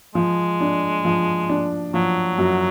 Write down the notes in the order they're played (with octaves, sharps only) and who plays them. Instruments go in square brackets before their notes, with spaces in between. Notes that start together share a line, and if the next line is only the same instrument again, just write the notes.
[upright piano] F3 [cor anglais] G#3
[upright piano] D4
F3
D4
[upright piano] F3 [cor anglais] F#3
[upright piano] F#2